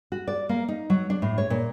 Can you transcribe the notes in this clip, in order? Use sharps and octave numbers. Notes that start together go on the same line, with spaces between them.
F#4
D5
A#3
D#4
F#3
D4
A2
C#5
A#2